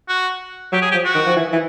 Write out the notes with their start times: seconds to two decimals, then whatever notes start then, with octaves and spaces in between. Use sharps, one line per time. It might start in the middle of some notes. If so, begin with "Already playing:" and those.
0.09 F#4
0.72 F#3 G4
0.82 G#4
0.92 F3 G4
1.05 F#4
1.15 D#3
1.27 F3
1.37 E3
1.53 E3